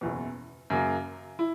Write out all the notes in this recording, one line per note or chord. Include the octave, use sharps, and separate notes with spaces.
F#1 E2 B2
F#2 C#3 F#3 A#3
E4